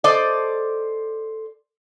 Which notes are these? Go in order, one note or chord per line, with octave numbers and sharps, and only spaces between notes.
A4 C5 D5 D#5